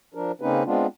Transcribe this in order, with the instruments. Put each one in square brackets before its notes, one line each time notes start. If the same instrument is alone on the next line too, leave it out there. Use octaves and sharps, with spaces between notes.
[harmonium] F3 D4 A#4
C#3 A#3 C4 C#4 D#4 B4
G#3 B3 C4 D4 F4